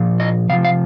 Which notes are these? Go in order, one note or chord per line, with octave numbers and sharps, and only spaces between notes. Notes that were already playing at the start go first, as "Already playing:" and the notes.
Already playing: A#2 F3
D#5
C3 F3 F5
F5